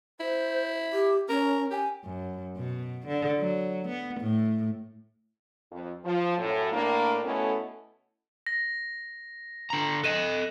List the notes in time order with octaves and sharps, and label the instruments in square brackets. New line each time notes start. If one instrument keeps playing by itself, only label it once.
[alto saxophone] E4 [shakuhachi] C5
[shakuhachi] G4
[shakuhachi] C#4 [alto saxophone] A#4
[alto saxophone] G4 [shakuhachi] G#5
[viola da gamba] F#2
B2
D3
F#3
B3
A2
[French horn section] F2
F3
F#2 A2
A2 A#3 D4
B2 A3 B3 C#4 E4 A4
[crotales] A#6
[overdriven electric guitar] D3 A#5
[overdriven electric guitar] A4 D#5 [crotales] F#6 D#7 E7